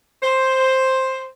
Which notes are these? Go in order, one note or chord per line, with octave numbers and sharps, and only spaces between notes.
C5